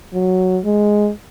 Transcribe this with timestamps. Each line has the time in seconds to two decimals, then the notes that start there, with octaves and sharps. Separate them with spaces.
0.13 F#3
0.64 G#3